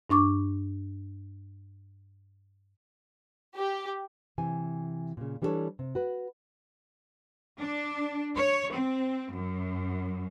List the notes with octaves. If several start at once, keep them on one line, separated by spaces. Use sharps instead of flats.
G2 D4 C#6 D6
G4
C3 E3 G#5
A#2 C#3
E3 G3 D4 F#4 A4 C#5
C3
F#4 B4
D4
C#5
C4
F#2